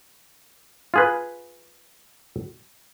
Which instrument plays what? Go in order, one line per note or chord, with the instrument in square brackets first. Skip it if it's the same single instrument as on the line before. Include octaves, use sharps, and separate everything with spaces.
[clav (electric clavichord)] F4 G#4 B4